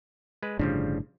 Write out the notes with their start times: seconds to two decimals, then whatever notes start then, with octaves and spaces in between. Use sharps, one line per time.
0.43 G#3 B4
0.59 G1 A2 C#3 F3 G3 D4